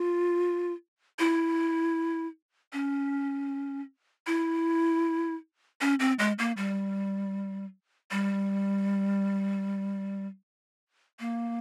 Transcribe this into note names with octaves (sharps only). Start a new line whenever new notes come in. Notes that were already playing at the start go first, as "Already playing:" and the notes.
Already playing: F4
E4
C#4
E4
C#4
C4
G#3
A#3
G3
G3
A#3